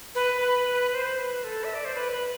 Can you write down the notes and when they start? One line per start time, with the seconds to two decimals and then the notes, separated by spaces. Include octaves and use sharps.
0.15 B4
0.41 B4
0.92 C5
1.18 B4
1.44 A4
1.64 E5
1.74 D5
1.85 C5
1.95 B4
2.12 B4